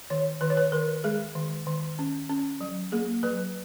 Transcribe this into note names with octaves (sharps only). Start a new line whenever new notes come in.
D#3 C#5
D#3 B4
C#5
B4
D#3 A#4
G#3 G#4
D#3
D#3
C#4
C#4
F#3
A#3 G#4
F#3 B4